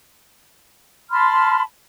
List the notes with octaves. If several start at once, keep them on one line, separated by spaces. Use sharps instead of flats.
A5 B5 C6 F6